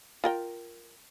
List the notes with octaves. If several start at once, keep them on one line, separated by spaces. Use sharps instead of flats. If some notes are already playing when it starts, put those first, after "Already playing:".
F4 A#4 G5